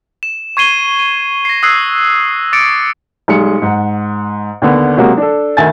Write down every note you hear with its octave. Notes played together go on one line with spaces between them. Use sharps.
E7
C#6 G#6 C7 D#7 G7
D#7
A#6 C7
D#6 E6 F#6 G#6 C7
D6 A6 C#7 D7
B1 G3 G#3 C#7
G#2 F#5
D#2 D3 B3
C3 F#3 G#3 A#3 F#4
D4 A4
D2 D#3 E5 G#5 A6